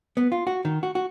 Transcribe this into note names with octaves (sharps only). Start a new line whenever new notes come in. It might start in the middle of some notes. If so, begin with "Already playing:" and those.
B3
F4
F#4
D#3
F#4
F#4